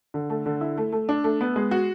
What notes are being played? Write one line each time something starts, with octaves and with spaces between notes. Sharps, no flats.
D3
A3
D3
E4
A3
A3
D4
A3
B3
G#3
F#4